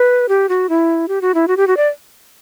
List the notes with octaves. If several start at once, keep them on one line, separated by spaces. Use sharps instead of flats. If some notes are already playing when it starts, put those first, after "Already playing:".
Already playing: B4
G4
F#4
E4
G4
F#4
E4
F#4
G4
F#4
D5